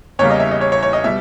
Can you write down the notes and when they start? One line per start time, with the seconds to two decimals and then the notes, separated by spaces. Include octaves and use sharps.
0.19 E2 C#3 G3 A#3 C#5
0.30 D#5
0.40 E5
0.51 D#5
0.61 C#5
0.72 C#5
0.83 C#5
0.93 D#5
1.04 B2 G3 E5